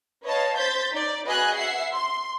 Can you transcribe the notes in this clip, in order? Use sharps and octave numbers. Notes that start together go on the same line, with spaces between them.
B4 C#5 D#5 F5 A5
C5 G6 A6 B6
D#4 D5
F#4 G#4 B4 D#5 G#5 F#6
E5 F#5 C7
C6